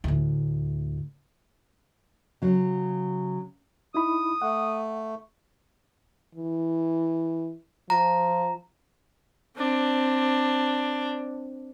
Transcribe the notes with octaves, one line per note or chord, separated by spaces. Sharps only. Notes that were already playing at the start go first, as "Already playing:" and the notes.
D2 A2
C#3 F#3
D#4 E4 B5 D#6
A3 F#5
E3
F3 A#5
C4 D4